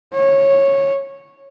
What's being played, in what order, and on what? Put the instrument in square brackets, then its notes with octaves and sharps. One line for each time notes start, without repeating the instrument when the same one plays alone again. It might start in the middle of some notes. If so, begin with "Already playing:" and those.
[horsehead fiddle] C#5